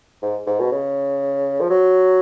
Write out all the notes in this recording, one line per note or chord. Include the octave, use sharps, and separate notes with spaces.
G#2
G#2
B2
C#3
F3
F#3